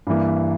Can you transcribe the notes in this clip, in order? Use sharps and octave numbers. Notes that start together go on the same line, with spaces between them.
G2 E3 A#3